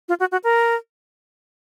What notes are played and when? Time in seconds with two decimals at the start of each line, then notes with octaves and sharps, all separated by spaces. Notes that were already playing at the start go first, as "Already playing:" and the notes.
0.09 F4
0.20 F#4
0.32 F#4
0.44 A#4